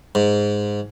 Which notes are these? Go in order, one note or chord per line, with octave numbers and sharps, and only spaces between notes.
G#2